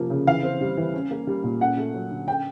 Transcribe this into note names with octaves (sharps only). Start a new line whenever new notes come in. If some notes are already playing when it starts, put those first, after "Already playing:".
Already playing: C3 F3 A#3 C#4
C#3
E3 F5
C4
G3
E3
C#4
A#3
G3
A#2
C#4 F#5
A3
F#3
D3
C#4 G5